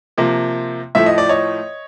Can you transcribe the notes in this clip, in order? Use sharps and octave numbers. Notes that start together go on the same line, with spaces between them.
C3 F3 A#3
A2 F3 A3 E5
D#5
D5
C#5 D#5